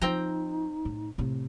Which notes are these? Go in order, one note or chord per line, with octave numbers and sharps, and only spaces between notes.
F3 C4 D#4 G5 A#5
A2
A2 C3